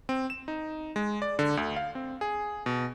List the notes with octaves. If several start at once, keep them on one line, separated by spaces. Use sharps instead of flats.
C4
E7
D#4
G#3
D5
D3
D2
F5
C4
G#4
B2